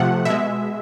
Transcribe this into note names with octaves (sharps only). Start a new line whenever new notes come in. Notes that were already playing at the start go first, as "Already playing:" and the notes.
Already playing: C3 F3 A3 F#5
B2 G#3 E5